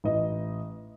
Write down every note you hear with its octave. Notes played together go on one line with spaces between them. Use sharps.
A1 D#5